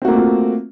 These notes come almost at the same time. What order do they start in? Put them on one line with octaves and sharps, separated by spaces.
C4 F#4 A#3 A3 F4